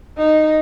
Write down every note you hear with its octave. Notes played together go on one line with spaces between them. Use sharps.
D#4